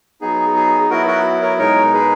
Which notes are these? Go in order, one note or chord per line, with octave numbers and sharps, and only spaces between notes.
F#3 B3 D#4 G#4
G#4
F#3 B3 E4 F#4 A#4
F#4 A#4
A#4 C#5
B2 G#3 D#4 A#4 C#5
G#4 B4